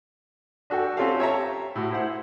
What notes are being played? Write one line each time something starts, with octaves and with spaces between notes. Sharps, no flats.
D4 F#4 A4 G5
C4 C#4 F4 G4 A4 F5
C#5 E5 A5 A#5
G4
A2 F#4
E4 C5 F#5